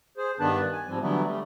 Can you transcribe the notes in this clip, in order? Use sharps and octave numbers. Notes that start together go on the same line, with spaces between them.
G#4 C5
G2 D#3 B3 D4 B4 A5
G#5
G#2 F3 G3 C4
D3 E3 F#3 G3 A3 B3
G3 A3